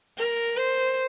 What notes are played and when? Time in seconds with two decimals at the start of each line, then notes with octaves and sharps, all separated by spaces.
0.19 A#4
0.57 C5